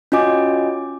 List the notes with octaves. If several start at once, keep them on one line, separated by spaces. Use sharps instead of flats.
C#4 F4 F#4 D#5 G#5 D6